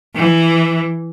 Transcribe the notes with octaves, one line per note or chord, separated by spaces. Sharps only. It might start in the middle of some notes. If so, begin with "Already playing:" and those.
E3